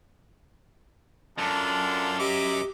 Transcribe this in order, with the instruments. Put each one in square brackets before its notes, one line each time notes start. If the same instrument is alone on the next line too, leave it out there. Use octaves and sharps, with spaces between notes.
[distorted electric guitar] F#2 [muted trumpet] D4 [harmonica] F4 A4
[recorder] G4 [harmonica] D#5 E5 D6